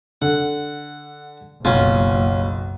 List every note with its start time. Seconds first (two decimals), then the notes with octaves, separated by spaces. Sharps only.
0.22 D3 F#5
1.65 F#1 B1 C#4 F4